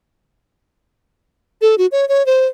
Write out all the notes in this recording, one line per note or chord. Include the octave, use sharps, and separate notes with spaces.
A4
F#4
C#5
C#5
C5